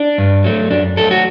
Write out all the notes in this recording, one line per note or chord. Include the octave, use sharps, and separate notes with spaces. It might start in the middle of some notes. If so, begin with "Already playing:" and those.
Already playing: D4
G2
F#3 A3
F#2 D4
F#3 A3 A4
F#4